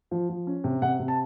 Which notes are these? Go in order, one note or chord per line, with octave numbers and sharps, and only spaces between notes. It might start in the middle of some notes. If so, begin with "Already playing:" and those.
F3
F3
C#4
C3
C3 F#5
C3
A5